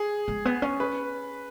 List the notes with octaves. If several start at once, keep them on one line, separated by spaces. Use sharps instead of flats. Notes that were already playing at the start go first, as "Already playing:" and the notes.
Already playing: G#4
G#3
B3
C#4
B4